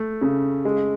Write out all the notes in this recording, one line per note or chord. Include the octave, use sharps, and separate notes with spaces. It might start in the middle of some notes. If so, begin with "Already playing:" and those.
Already playing: A3
C#3
G#3